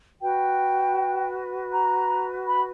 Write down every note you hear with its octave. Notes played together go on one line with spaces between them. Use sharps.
F#4 B4 G5
A#5
B5